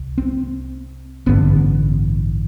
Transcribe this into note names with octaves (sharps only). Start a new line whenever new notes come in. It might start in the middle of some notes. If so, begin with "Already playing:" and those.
Already playing: C2
C4
A1 G2 D3 B3